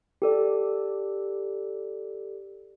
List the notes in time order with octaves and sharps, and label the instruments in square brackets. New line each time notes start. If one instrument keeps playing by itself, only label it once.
[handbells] G4 A4 D5